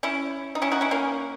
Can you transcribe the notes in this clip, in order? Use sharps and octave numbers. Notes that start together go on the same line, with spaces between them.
C#4 E4
D#4
C#4 E4
D#4 F#4
C#4 E4
A#3 C#4